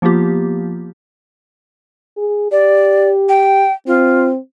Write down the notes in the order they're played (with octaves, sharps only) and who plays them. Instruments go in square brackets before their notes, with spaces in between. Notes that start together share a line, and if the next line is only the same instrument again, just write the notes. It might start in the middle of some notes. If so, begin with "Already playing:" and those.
[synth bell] F3 A#3 B3 F4 G4
[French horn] G#4
[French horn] G4 [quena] D5
[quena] G5
[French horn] C4 [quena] F4